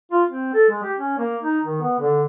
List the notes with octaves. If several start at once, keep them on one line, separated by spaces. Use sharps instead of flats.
F4
C4
A4
G#3
G4
C#4
A#3
D#4
D#3
B3
D3